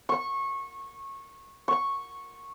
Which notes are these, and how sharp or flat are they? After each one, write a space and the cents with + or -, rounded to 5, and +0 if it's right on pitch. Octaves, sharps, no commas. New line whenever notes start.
C#6 -20
C#6 -10